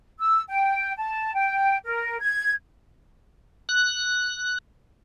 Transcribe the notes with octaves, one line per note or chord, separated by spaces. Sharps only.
E6
G5
A5
G5
A#4
G#6
F#6